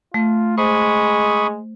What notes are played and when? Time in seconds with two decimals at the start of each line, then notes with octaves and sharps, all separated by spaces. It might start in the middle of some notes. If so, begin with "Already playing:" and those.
0.14 A3 F4
0.58 G#3 C5 B5 C#6 D#6